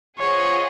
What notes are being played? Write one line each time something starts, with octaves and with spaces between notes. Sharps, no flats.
F4 G#4 C5 C#5 D#5 F#5